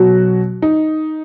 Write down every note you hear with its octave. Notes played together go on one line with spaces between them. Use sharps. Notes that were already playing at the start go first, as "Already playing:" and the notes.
Already playing: B2 F#3 F#4
D#4